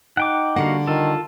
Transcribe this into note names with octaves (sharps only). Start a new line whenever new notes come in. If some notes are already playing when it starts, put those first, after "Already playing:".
D#4 F#5 G5 D6
D3 G3 A#3 F#4 F5 F#5
D#3 F4 A4